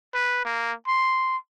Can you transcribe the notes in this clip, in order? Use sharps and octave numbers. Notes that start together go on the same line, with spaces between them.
B4
A#3
C6